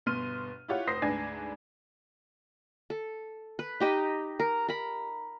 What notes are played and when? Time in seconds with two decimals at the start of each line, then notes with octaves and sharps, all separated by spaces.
0.06 G1 B2 C6 F6 D#7
0.68 E4 F4 G4 C#5 F#5
0.87 F1 C5 D#6 A#6 C7
1.02 D2 G#2 D4 B4 G#5 G#6
2.90 A4
3.59 B4
3.80 D#4 G4 D#5
4.40 A#4
4.69 A#4 B5